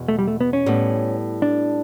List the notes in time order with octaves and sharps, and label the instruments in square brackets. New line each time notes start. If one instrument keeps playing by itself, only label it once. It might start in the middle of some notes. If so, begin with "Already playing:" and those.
Already playing: [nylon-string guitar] E2 B2
[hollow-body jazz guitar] A3
G3
A3
B3
C#4
[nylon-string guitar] A2 G3 B3
[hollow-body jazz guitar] D4